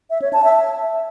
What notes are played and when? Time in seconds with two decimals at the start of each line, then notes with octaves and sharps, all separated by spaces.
0.10 E5
0.22 C#5
0.33 A5
0.44 E5